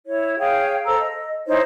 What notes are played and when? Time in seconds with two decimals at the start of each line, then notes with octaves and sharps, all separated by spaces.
0.08 E4 C#5
0.39 G#4 C#5 F5 G5
0.86 A4 C5 A#5 E6
0.99 D#5
1.47 D#4 E4 C5 C#5